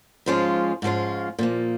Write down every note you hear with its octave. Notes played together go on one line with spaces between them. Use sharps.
G#2 F3 G#3 C#4 F4
G#2 F3 G#3 C#4 F4
A#2 F3 A#3